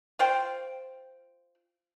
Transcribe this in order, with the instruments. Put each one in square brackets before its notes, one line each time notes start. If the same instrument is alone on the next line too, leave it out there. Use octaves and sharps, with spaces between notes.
[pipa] F4 C5 G5